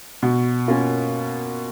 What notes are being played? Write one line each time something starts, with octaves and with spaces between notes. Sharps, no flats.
B2
A#3 C#4 F4 A#4